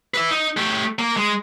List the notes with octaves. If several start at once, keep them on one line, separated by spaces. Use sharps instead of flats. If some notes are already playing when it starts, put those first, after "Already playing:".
B4 E5
D#4
A3 G4
A#3
G#3